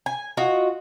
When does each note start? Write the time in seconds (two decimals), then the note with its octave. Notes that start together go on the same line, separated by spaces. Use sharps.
0.06 G#5
0.37 F4 F#4 D#5